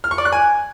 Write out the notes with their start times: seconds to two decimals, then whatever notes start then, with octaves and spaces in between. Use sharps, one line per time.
0.04 F6
0.11 C#6
0.18 D5
0.25 F#6
0.32 G#5